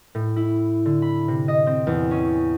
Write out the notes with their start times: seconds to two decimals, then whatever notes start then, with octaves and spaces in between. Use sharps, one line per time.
0.15 A2
0.36 E4
0.86 D3
1.02 B5
1.28 C3
1.48 D#5
1.67 C4
1.87 E2
2.11 C#4